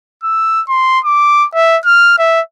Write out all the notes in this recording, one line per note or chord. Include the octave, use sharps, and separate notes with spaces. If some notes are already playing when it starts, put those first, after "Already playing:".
E6
C6
D6
E5
F6
E5